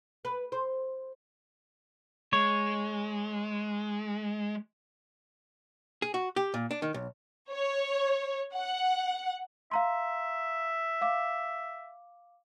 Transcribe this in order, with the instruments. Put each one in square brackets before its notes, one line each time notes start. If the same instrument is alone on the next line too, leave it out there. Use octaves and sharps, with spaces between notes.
[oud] B4
C5
[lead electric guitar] G#3 [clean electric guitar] C#5
[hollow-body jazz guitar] G#4
F#4
G4
A#2
D4
D#3
B1
[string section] C#5
F#5
[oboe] E5 [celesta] F5 A#5 C6
[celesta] F5 D6